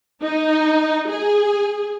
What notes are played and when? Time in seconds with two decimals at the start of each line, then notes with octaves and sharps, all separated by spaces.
0.22 D#4
1.08 G#4